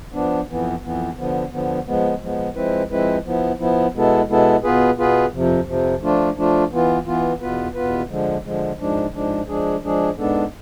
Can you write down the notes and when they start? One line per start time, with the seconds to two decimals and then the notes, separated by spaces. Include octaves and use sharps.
0.13 F3 B3 D4
0.48 F2 E3 B3
0.82 F2 E3 B3
1.17 D3 F3 B3
1.51 D3 F3 B3
1.87 F3 G#3 B3
2.21 F3 G#3 B3
2.55 F3 G#3 C4 E4 B4
2.90 F3 G#3 C4 E4 B4
3.24 F3 B3 E4
3.59 F3 B3 E4
3.94 B2 G#3 B3 E4 A4
4.29 B2 G#3 B3 E4 A4
4.64 B2 B3 F4 G#4 B4
4.98 B2 B3 F4 G#4 B4
5.33 F2 C3 F3
5.67 F2 C3 F3
6.02 F3 A3 D4 F4
6.36 F3 A3 D4 F4
6.71 E3 B3 F4
7.06 E3 B3 F4
7.40 E2 B2 B3 F4 B4
7.75 E2 B2 B3 F4 B4
8.09 D3 F3 G#3
8.44 D3 F3 G#3
8.79 G#2 F3 G#3 D4
9.14 G#2 F3 G#3 D4
9.48 F3 G#3 D4 G#4
9.83 F3 G#3 D4 G#4
10.17 G#2 G#3 B3 D4 A4